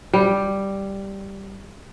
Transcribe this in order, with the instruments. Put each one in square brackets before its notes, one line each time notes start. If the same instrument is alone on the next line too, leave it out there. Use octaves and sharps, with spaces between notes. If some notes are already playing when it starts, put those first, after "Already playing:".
[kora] G3